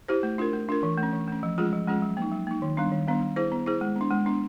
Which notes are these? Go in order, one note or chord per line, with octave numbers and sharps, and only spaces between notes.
E4 G4 C5
A3
D4 F4 A#4
A3
D4 F4 A#4
E3
A3
C#4
E3
A3 C#4
F3
G#3 C#4 F4 G#4
F3
G#3 C#4 F4 G#4
F#3
A#3 D#4
F#3
A#3 D#4
D#3
G3 B3 D4
D#3
G3 B3 D4
B3
E4 G#4 C5
B3
E4 G#4 C5
G#3
B3 D4
G#3
B3 D4